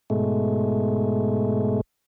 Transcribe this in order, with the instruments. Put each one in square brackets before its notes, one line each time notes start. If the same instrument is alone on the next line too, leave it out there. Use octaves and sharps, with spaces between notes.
[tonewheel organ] G#2 B2 G#3 A3